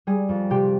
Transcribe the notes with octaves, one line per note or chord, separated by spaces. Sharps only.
G3 G#4
F2
C3 G4